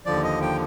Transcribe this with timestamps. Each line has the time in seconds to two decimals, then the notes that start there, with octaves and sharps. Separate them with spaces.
0.06 D#2 D3 F3 D5
0.24 D#5
0.41 G5